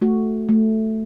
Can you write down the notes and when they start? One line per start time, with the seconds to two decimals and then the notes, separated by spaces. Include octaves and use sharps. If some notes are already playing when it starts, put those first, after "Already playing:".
0.01 A3 F#4
0.49 A3